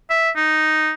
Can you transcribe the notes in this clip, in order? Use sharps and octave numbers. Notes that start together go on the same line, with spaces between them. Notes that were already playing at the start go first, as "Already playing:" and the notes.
E5
D#4